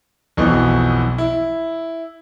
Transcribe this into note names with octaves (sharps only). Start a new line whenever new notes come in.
B1 F2 B2 E3
E4